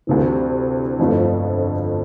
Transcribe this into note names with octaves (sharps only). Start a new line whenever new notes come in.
D2 C3 E3
G1 F2 D3 F3 A3